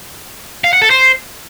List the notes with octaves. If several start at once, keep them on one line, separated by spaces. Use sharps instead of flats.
F5
F#5
A4
C5